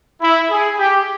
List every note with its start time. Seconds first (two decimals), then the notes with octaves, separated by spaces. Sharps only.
0.21 E4
0.50 G#4
0.78 G4